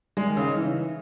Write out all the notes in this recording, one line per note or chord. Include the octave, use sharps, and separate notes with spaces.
G#3
D#3
C#3
D#4
E3